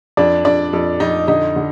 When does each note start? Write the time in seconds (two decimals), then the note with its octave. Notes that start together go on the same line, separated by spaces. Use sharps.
0.17 F2 D4 D5
0.45 F2 D4 D5
0.73 F2
1.00 F2 D#4 D#5
1.28 D3 D#4 D#5
1.56 D3